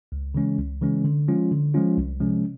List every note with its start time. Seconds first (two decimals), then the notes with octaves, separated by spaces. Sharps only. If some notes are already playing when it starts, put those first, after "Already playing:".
0.12 C#2
0.34 C#3 E3 G#3 C#4
0.59 C#2
0.81 C#3 E3 G#3 C#4
1.04 D3
1.28 F3 G#3 C#4 F4
1.51 D3
1.74 F3 G#3 C#4 F4
1.98 C2
2.20 C3 F3 G#3 C#4